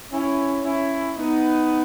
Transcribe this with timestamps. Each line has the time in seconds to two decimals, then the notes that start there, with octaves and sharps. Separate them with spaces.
0.12 C#4 E4
0.64 C#4 E4
1.17 B3 D#4